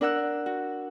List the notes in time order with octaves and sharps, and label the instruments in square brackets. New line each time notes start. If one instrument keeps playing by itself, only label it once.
[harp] D4 A#4 F#5 E6 F#6
F#4